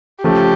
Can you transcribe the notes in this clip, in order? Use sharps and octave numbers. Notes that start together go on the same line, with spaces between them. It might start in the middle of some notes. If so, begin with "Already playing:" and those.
C#3 F3 A3 C#4 G4